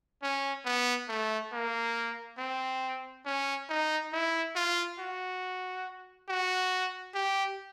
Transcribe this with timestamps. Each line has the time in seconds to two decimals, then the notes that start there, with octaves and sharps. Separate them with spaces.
0.23 C#4
0.65 B3
1.09 A3
1.53 A#3
2.38 C4
3.26 C#4
3.69 D#4
4.13 E4
4.56 F4
4.99 F#4
6.29 F#4
7.15 G4